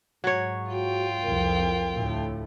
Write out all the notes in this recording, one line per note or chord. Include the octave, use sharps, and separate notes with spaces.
G#2 F#3 C#5
F4 F#4 G5
C2 F2 A#4
D2 A2 A3